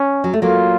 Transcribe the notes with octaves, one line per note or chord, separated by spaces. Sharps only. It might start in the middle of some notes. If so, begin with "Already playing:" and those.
Already playing: C#4
F#3
A3
F#3 A#3 F4